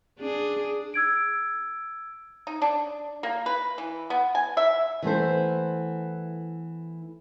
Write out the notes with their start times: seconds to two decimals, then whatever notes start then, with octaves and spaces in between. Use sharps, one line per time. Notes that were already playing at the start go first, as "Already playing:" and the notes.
0.20 D4 G#4
0.94 E6 G#6 D7
2.47 D#4
2.62 D4
3.23 A#3
3.46 B4
3.78 E3
4.10 B3
4.35 G#5
4.57 E5
5.02 E3 A3 B3 C5